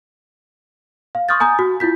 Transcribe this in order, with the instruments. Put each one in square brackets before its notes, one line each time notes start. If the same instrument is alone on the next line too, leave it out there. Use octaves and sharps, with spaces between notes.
[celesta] F5
C6 C#6 D#6 F6 G6 A6
G#5 A#5 D#6 G6
F#4
E4 F4 G6 B6